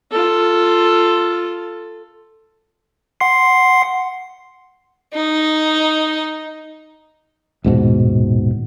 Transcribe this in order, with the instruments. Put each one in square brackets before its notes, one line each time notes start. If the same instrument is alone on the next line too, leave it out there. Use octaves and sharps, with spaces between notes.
[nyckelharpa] F4 A4
[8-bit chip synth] F#5 C6 C7
[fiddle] D#4
[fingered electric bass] D#1 G#2 B2